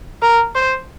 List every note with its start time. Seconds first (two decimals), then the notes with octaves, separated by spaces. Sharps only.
0.22 A#4
0.55 C5